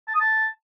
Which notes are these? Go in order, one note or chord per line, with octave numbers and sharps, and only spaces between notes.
A5
D#6
A5